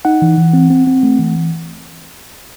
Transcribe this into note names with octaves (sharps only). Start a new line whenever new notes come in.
D#4 F#5
E3
E3
C4
C4
C4
A3
E3